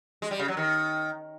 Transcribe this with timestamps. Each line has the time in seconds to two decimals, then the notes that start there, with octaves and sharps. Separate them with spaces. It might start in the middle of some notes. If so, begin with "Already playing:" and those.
0.22 G#3
0.31 G3
0.39 C#3
0.48 F#3
0.57 D#3